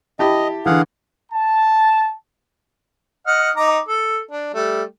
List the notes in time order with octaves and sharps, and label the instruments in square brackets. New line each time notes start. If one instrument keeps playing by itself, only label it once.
[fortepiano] E4 G4 B5 [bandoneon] D#5 [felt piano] A5
[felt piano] D3 E3 [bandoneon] G#4 F5 F#5
[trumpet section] A5
[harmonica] D#5 F#5 F6
D#4 A#5 D6
A4
D4
G3 A3